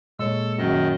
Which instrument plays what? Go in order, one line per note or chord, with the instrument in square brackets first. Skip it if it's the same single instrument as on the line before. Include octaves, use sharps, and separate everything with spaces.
[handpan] A#2 C#5 [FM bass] G#3 [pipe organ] A4 E6
[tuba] F#2 [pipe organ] D#3 D#5